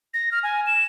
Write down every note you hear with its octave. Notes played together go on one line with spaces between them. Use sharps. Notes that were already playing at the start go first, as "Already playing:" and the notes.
A#6
F6
G#5
E7